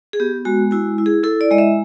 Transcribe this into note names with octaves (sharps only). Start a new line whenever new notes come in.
G#4
B3 G4
G#3 F#4
E4 F#4
E4
G#4
E4 A4
D5
G#3 D#5
E5